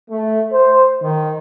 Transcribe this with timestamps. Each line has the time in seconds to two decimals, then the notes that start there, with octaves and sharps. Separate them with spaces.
0.10 A3
0.52 C5
1.01 D#3